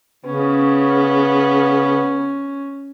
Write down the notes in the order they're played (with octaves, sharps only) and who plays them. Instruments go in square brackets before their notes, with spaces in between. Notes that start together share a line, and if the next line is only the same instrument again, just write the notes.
[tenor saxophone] C#3 [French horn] B3 [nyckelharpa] C#4